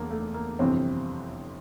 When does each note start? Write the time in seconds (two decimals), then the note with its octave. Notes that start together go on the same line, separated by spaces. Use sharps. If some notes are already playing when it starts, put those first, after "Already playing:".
Already playing: E1 E2 A#3
0.10 A3
0.34 A#3
0.59 G1 F2 C3 E3 C4